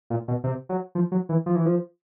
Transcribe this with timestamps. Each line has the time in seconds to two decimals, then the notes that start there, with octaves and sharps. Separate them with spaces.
0.10 A#2
0.28 B2
0.44 C3
0.69 F#3
0.95 F3
1.12 F#3
1.29 E3
1.46 F3
1.56 E3
1.66 F3